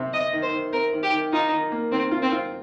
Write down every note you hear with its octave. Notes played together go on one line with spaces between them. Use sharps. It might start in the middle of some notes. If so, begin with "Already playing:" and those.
Already playing: C3 C4
C3 D#5
D#3
C5
D#3
C4 A#4
D#3
G4
D#3
D#4 F4
D#3
A#3
D#3 C4
F4
C4
F4